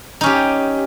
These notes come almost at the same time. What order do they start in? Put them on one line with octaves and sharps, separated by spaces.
D#4 C#4 G4